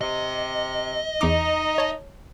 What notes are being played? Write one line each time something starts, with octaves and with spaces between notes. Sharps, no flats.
C3 D#5
E2 D#4 D6
C#5 A5